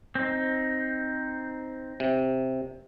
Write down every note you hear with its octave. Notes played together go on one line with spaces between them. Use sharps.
C4 D#4
C3